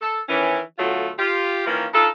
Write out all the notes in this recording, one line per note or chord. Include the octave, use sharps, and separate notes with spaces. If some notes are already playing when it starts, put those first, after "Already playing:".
A4
D#3 E3 C#4
B2 D3 F#3 A3 F4
F4 G4
D#3 E3 A#3 C#4 F4 A#4
D4 D#4 F4 A4